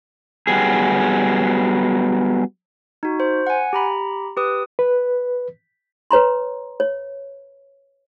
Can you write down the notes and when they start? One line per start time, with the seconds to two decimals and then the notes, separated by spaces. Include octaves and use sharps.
0.47 F#3 G3 B3 G#4
3.03 D#4 F#4
3.20 C5
3.47 F#5 G#5
3.73 G4 A#5 B5
4.37 G4 B4 D#6
4.79 B4
6.11 B4 C#5 A#5 C6
6.80 C#5